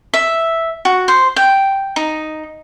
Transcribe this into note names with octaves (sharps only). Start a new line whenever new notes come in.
E5
F#4
C5
G5
D#4